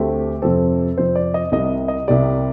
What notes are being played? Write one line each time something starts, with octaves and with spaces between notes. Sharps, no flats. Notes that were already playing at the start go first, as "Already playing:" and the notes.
Already playing: D2 D3 A3 C4 G4
F2 C3 F3 C4 A4
F2 C3 F3 C4 C5
D5
D#5
C2 C3 G3 D#5
D#5
C2 C3 G3 D5